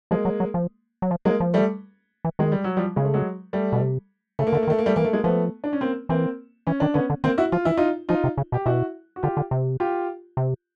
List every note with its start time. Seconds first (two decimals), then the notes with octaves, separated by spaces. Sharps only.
0.11 F3 G#3 A#3
0.25 F#3
0.40 F#3
0.54 F3
1.02 F#3
1.11 F3
1.25 F#3 G#3 A#3
1.40 F3
1.54 G3 A3
2.25 E3
2.39 D#3 G#3
2.52 G3
2.64 F#3
2.77 F3 G3
2.96 C#3 G#3
3.05 A3
3.14 F#3 G#3
3.53 G3 A3
3.73 B2
3.81 C3
4.39 C#3 A3
4.47 A#3
4.52 D3 A3
4.62 A#3
4.68 D#3
4.70 A3
4.78 A#3
4.86 G3 A3
4.96 E3 A#3
5.05 A3
5.13 G#3 A#3
5.24 F3 A3 B3
5.64 D4
5.73 C#4
5.81 A#3 C4
6.09 E3 A#3 C4
6.67 E3 C#4
6.80 D#3 D4
6.94 D3 B3 C#4
7.10 D3
7.24 D#3 A#3 C4
7.38 E4 F#4
7.52 F3 F4
7.65 E3 E4
7.77 D#4 F4
8.09 F3 D#4 F4
8.24 C3
8.37 C#3
8.52 B2 G4
8.66 B2 E4 F#4
9.16 F#4
9.23 D3 F4 G4
9.37 D3
9.51 C3
9.80 F4 G4
10.37 C3